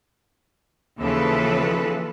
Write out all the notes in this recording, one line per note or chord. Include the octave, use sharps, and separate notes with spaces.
D#2 C#3 E3 F3 A4 B4